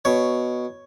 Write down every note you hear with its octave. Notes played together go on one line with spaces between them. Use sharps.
B2 C#5